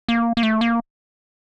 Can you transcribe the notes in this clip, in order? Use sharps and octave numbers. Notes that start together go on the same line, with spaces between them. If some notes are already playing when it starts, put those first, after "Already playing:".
A#3
A#3
A3
A#3